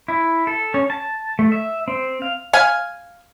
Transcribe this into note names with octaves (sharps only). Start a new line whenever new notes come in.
E4
A4
C#4
A5
A3
E5
C4
F5
F5 G#5